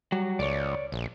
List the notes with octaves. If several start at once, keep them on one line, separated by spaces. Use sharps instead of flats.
F#3 G3 F#4
C#2 C#5 D5
A#1